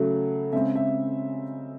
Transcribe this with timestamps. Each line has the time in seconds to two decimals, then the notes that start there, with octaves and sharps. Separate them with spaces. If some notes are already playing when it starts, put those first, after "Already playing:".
Already playing: C#3 F#3 A3
0.53 C#3 G#3 C4 E5
0.75 E5